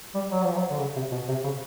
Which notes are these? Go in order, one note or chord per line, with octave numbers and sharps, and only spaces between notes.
G3
F#3
F3
F#3
D3
C#3
C3
B2
C3
C#3